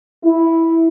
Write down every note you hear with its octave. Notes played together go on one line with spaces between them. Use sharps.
E4